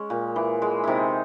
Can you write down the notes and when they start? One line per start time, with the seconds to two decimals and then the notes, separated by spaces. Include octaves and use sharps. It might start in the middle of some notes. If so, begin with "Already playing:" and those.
Already playing: G#3 C#4
0.10 A#2
0.36 E3
0.62 G#3
0.84 C3 D#4 E4